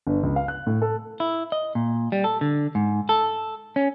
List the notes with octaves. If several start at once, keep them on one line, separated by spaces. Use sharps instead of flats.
G1
C#2
F5
F#6
A2
A4
E4
D#5
A#2
G3
A4
D3
G#2
A4
C#4